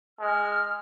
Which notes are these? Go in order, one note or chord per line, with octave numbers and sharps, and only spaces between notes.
G#3 F6